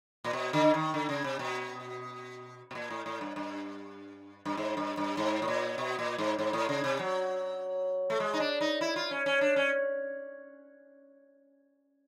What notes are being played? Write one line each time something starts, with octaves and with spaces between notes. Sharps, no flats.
A#2
B2
D3
D#3
D3
C#3
C3
B2
B2
A#2
A2
A2
G2
G2
G2
G#2
G2
G2
G#2
A2
A#2
B2
A#2
G#2
G#2
A2
C#3
C3
F#3
A3
G#3
D#4
D4
D#4
E4
F4
C#4
C#4
D4
C#4